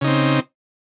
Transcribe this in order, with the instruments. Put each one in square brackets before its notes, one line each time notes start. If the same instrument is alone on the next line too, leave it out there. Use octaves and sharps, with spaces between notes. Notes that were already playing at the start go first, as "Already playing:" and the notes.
[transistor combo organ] C#3
D#4
C4